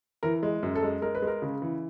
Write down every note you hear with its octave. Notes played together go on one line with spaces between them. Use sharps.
E3 A#4
G#3
F#2
A4
G#3
G#3 A#4
B4
G#3
A#4
C#3
E3